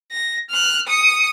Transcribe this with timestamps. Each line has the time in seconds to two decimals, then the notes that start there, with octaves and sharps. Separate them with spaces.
0.12 A#6
0.50 F6 F#6
0.88 D#6 C#7